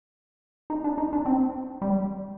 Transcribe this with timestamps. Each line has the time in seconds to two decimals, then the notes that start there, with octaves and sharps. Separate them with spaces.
0.70 D#4
0.84 D4
0.98 D#4
1.13 D4
1.26 C4
1.82 G3